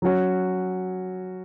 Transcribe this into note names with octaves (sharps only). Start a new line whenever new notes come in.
F#3 C#4 F#4